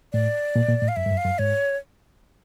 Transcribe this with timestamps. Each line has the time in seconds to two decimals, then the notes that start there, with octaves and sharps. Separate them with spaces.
0.13 A2 D5
0.56 A#2
0.68 A#2
0.82 A2
0.88 F5
0.96 F#2 E5
1.06 G2
1.11 F#2
1.17 F5
1.25 F#2
1.39 G#2 C#5